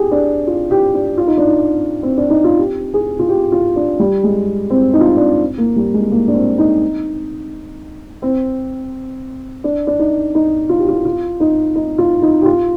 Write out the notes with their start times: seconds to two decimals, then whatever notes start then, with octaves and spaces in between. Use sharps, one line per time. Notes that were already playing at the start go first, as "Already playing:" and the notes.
Already playing: G4 G#4
0.11 D4
0.47 F4
0.71 G4
0.94 D4
1.18 F4
1.27 D#4
1.38 D4
1.47 D#4
2.03 C4
2.17 D4
2.30 D#4
2.44 F4
2.58 G4
2.94 G#4
3.19 F4
3.29 G4
3.52 F4
3.76 D4
4.00 G3
4.23 G#3
4.70 C4
4.93 D#4
5.01 F4
5.09 D#4
5.17 D4
5.58 A#3
5.76 G3
5.94 G#3
6.12 A#3
6.28 D4
6.35 C4
6.58 D#4
8.22 C4
9.64 D4
9.87 D4
9.99 D#4
10.35 D#4
10.69 F4
10.79 G4
10.88 F4
11.05 F4
11.40 D#4
11.75 D#4
11.98 F4
12.22 D#4
12.42 G4
12.45 F4